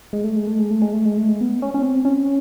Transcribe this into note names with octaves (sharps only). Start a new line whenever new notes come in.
G#3
A3
G#3
A3
G#3
A3
G#3
A3
G#3
A3
G#3
B3
C#4
C#4
C4
C#4